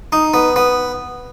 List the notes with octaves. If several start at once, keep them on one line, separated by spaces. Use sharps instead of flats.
D#4
B3
B3